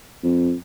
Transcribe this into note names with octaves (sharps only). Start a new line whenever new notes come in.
F2